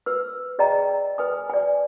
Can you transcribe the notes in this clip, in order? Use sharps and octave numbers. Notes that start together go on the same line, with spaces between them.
B4 E6
G#4 D5 D#5 G5 A#5
B4 G#5 D#6
D5 G#5